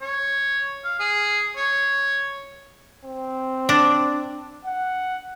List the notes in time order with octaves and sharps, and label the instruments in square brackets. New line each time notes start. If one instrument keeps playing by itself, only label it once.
[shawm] C#5
F5
G#4
C#5
[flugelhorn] C4
[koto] D4
[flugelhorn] F#5